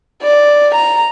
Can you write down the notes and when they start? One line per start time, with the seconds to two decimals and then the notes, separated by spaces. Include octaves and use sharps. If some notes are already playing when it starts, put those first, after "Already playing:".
0.23 D5
0.75 A#5